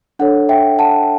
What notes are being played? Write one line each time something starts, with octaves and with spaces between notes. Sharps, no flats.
D4 A4 C#5 F#5
E5 G5
F#5 A5